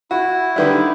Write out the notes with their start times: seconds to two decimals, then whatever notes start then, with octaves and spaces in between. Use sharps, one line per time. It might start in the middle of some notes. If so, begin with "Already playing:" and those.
0.11 E4 F#4
0.56 D3 D#3 G3 B4 E5